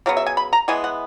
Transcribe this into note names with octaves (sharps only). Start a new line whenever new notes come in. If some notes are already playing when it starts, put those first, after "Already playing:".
C#3 F#3 B3
E5
G#5
B5
A#5
E3 G#3 B3 G#5
F#5